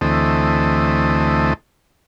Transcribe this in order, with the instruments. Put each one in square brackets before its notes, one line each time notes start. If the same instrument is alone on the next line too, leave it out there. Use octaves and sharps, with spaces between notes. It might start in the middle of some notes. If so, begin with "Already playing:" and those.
[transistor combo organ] D2 E3 A3 C4 D#5